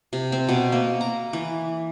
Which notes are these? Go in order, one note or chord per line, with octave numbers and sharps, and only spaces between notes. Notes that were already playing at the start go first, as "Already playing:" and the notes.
C3
C4
B2
A#3
A#5
E3